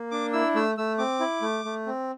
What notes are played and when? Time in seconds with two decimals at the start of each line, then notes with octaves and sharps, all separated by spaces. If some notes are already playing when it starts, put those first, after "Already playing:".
Already playing: A#3
0.11 D4 D6
0.33 E4 E6
0.55 A3 E6
0.78 A3 E6
0.98 C4 D6
1.20 E4
1.42 A3
1.65 A3
1.86 C4